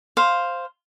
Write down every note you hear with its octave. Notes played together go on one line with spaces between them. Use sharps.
C5 F5